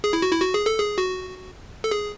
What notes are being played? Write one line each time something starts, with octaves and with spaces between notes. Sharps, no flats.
G#4
E4
F#4
E4
F#4
G#4
A4
G#4
F#4
A4
G#4